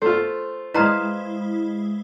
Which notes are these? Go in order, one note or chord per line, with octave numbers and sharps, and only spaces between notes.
A3 F4 C5
G#3 E4 B4 C5 D#5 F5 A#5